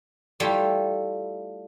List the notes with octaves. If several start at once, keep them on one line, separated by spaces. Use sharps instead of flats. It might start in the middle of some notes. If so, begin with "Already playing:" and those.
G3 A3 E4 F4 G4